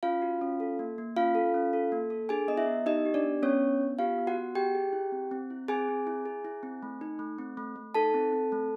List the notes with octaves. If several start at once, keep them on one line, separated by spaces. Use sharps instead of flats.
C#4 F4 F5
F#4
C#4
A4
A#3
A#3
C#4 F4 F5
A4
C#4
A4
A#3
A4
D4 G#4 G#5
B3 D#5
E4 E5
B3
D#4 G4 D#5
G4
D4 D5
B3
B3 C#4 C#5
D4
B3
F4 G4 F5
B3
F#4 F#5
B3
G4 G#4 G5
G#4
E4
C4
C4
E4
C4 G#4 G#5
C4
E4
G#4
E4
C4
A3
D#4
A3
C4
A3
A3
D#4 A4 A5
C4
C4
A3